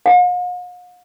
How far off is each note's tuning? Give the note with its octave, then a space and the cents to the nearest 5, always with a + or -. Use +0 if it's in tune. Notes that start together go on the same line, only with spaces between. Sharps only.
F5 +45